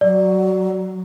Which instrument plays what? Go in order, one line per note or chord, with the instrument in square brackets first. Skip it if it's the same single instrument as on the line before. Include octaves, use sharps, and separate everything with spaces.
[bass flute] F#3 [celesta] D5